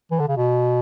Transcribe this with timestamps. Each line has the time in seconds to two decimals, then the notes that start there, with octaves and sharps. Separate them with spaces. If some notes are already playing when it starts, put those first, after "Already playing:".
0.11 E3
0.20 D3
0.29 C#3
0.37 B2